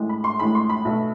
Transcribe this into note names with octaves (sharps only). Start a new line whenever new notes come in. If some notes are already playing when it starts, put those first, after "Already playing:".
Already playing: A1 A2 G#3
B5
C6
A1 A2 G#3 B5
C6
B5
B1 B2 A3